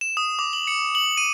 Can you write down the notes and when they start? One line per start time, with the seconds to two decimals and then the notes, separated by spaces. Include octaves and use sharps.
0.01 E7
0.17 D#6
0.39 D6
0.53 F#7
0.67 C#7
0.95 F#7
1.17 D#7